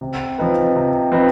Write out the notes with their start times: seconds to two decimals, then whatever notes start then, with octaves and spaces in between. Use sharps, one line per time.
0.01 C3
0.38 F3 C4 D#4 B4
0.76 C3
1.12 F3 C4 D#4 B4